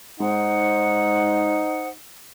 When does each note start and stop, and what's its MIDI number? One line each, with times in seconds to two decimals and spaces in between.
0.20 1.65 44
0.20 1.95 63
0.20 1.88 72
0.20 1.88 78
0.20 1.88 87